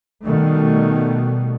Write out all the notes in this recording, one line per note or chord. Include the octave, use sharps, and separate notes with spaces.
B2 D#3 G3 A3